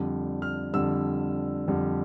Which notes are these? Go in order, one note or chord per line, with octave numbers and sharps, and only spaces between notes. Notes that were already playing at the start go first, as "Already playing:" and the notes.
Already playing: F2 D3 G3
F6
F2 D3 G3 E6
F2 D3 G3